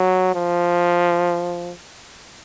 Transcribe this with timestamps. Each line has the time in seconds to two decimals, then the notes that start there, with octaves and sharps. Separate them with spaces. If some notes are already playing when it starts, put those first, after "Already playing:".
Already playing: F#3
0.35 F3